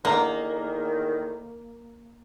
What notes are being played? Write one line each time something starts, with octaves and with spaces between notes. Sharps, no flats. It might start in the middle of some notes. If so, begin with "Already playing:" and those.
E2 A2 D3 D#3 A#3 D#4 A#5